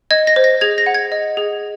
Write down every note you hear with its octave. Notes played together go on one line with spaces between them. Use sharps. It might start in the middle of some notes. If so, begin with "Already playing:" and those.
D#5 G#6
A#6
C5
A#6
G#4 G#6
A#6
F#5
G#6
D#5
G#4